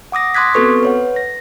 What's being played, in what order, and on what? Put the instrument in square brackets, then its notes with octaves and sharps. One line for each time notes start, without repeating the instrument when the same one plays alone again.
[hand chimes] F#5 D6 D#6 A#6
C6 D6 D#6 F#6 G#6 B6
B3 C4 F#4 A4 B4 C#6
B4 C#5 F#5
A#6